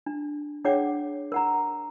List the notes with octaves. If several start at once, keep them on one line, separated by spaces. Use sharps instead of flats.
D4
D4 G#4 C#5 F#5 G5 D6
A#4 F#5 A#5